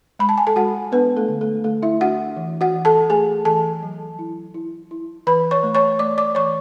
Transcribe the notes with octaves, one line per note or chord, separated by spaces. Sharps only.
G#3 B5
A5
G#5
A4 A5
G#3 F#4 F#5
B3 D4 B4
A3 A4
D3
A3 A4
D3 A3 A4
E4 E5
D4 F#4 F#5
E3
F#4 F#5
E3
A4 A5
A3 G#4 G#5
E3 A4 A5
F#3
E4
E4
E4
E3 B4 B5
C#5 C#6
A3
C#5 C#6
A3 D5 D6
D5 D6
E3 C#5 C#6